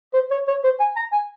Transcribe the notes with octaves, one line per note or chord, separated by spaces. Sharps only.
C5
C#5
C#5
C5
G#5
A#5
G#5